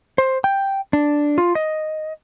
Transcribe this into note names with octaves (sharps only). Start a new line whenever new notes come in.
C5
G5
D4
F4
D#5